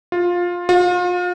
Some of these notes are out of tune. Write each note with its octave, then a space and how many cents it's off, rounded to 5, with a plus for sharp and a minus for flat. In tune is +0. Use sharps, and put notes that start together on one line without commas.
F4 +15
F4 +40